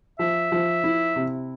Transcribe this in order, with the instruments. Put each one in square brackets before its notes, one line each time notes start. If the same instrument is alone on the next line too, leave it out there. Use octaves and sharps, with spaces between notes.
[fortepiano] F3 [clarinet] E5
[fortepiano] F3
E4
C3